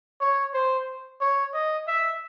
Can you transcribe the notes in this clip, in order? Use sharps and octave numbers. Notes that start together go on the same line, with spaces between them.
C#5
C5
C#5
D#5
E5